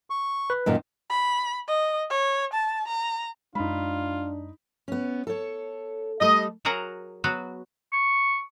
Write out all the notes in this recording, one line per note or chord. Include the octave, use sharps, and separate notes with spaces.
C#6
B4
F#2 A#2 D#3
B5
D#5
C#5
A5
A#5
F#2 G#3 D4 D#4 F4 B5
B3 C#4
A4 C#5
G3 A3 D#5
F#3 F#4 G#4 A#4 F#5 A#5
F#3 B3 F#4
C#6